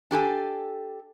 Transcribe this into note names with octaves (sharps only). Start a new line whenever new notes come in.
D4 G4 A4 G#5